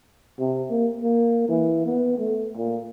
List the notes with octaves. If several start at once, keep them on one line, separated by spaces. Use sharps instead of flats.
C3
A#3
A#3
E3
B3
A3
A#2